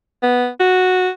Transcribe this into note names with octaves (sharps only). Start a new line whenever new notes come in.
B3
F#4